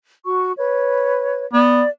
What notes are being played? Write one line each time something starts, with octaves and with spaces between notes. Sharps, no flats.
F#4 C#6
B4 C#5
B3 D5